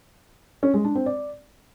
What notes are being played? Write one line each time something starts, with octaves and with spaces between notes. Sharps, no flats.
C#4
G#3
D4
C4
D5